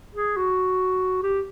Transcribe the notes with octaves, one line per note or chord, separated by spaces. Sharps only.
G#4
F#4
G4